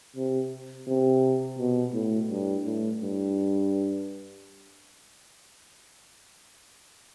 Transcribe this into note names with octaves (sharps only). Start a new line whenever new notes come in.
C3
C3
B2
A2
G2
A2
G2